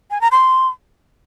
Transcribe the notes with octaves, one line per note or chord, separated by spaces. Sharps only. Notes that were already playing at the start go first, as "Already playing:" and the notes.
G#5
A#5
C6